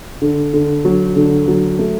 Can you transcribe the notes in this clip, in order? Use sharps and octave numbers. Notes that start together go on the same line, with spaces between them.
D3
D3
F#3
D3
F#3
A3